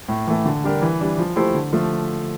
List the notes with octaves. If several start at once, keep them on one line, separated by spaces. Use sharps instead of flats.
A2
E3 A3
D3
G3 D4 G4 A#4
E3
G3 D4
F3
A3 E4 G4 C5
D3
F3 A3